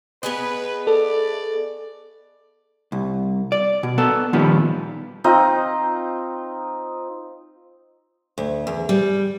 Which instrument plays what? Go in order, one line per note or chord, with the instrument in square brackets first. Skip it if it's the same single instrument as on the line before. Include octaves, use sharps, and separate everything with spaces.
[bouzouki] B3 G#4 D#5 [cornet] B4
[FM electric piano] A4 [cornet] D5
[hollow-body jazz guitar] C2
D5
B2
B3 A4
A#2 D#3 F3 G3 B3
[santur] C4 D#4 F4 D#5
[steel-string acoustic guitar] D2
E2
G3